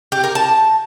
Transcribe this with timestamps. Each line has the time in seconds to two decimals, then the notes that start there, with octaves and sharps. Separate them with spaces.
0.12 G4
0.24 A#4
0.35 A5